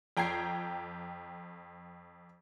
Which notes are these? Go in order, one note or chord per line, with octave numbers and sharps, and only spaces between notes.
F2 G5 A#5 G#6 C7